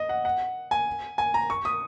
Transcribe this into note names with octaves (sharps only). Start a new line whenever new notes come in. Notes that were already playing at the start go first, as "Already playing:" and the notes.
Already playing: D#5
F#5
F#5
G#5
G#5
A#5
C#6
D#6